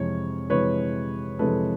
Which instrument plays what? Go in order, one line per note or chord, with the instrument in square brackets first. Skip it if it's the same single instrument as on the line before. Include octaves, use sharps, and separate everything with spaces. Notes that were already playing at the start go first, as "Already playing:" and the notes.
Already playing: [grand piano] F2 C3 E3 G#3 C#5
F2 C3 E3 G#3 B4 C#5
F2 C3 E3 G#3 A4 B4